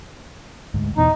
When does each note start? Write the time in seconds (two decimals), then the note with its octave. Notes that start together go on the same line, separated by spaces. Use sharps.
0.74 D2 G#2
0.97 E2 B2 E3 D#4